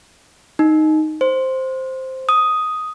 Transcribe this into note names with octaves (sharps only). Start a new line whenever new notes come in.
D#4
C5
D#6